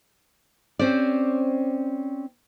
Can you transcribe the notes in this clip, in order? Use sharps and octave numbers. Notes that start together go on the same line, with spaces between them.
C4 C#4 G4 C5 D5